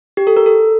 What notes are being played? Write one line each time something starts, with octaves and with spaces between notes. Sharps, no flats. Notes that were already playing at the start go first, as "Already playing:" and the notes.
G4
A4
A#4
A4